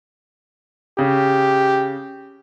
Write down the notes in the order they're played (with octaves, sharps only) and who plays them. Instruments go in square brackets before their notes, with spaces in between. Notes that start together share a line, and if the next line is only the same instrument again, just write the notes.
[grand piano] C#3 [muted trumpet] G4